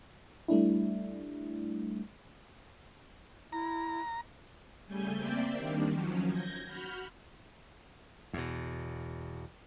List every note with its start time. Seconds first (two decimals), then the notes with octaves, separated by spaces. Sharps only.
0.48 G3 A3 D4 E4
3.52 E4 A#5
4.86 C#3 G3 A3 G#5 G6
5.14 A#3 C4 D5 E5 G5
5.57 D#3 G3 A#3 D4
5.87 D#3 F3 F#3 C#4
6.28 G6 G#6 A#6
6.65 F#4 B5 F6 G6
8.33 E2 B2